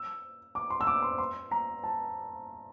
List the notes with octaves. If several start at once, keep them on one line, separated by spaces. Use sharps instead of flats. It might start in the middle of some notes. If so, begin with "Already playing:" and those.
Already playing: E6
D6
C6
E6
D6
C6
C6
A#5
A5